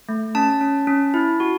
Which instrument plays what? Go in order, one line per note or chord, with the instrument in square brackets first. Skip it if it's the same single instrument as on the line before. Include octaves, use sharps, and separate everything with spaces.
[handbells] A3
C#4 A5
C#4
C#4
E4
F#4